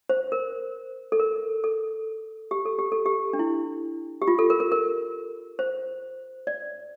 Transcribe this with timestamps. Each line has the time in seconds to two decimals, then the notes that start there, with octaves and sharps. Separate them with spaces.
0.09 C5
0.32 A#4
1.12 A4
1.20 A#4
1.64 A4
2.51 G4
2.65 A4
2.79 G4
2.92 A4
3.06 G4
3.33 D4
3.39 E4
4.22 G4
4.28 F4
4.39 A4
4.50 A#4
4.60 A#4
4.72 A#4
5.59 C5
6.47 D5